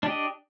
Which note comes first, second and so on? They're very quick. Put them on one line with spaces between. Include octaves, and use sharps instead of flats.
D4 G4 D#5